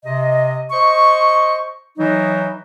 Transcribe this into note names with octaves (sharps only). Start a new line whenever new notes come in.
C3 D#5
C5 D#5 C#6
E3 F#3 D#4